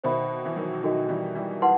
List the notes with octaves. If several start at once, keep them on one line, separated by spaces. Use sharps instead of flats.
B2 D#3 C5 E5 B5
E3
D#3 F#3
D#3 F#3 D#4 F#4 A4 D#5
E3 G3
E3 G3
E4 B4 F#5 A5 C6